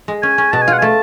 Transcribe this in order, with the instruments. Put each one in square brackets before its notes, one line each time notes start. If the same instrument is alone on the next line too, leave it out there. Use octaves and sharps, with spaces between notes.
[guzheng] G#3
[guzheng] C#4 [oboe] G#5
[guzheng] C#4
[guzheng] B2 [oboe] A5
[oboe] G#5
[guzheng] F4 [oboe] F#5
[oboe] G#5
[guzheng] A3 [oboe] A5